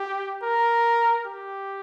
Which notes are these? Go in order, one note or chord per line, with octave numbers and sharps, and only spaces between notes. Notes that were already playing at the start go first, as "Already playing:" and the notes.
Already playing: G4
A#4
G4